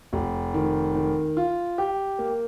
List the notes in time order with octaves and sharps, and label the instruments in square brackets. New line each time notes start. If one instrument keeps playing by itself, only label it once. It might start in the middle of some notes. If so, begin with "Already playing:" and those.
[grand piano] F1
D#3
D#3
F4
G4
A#3